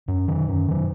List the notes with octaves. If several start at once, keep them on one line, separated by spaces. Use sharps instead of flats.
F#2
D#3 F#3
F#2
D#3 F#3